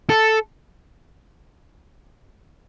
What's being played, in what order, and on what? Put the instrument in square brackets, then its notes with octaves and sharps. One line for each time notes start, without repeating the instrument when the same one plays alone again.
[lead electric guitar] A4